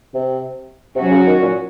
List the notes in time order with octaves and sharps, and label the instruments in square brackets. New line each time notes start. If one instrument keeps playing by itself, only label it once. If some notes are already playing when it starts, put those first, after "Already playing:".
[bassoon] C3
[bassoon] C3 [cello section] F#3 C#4 F#4
[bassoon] C#3
D#3
A#2